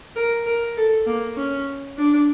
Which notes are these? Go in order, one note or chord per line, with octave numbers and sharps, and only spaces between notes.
A#4
A#4
A4
A#3
C#4
D4